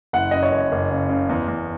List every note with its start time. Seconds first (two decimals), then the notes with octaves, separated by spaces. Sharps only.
0.13 F#1 F#5
0.31 F#2 D#5
0.43 C#5
0.52 F#1
0.72 F#1
0.91 C#3
1.09 C#3
1.29 E2
1.48 E2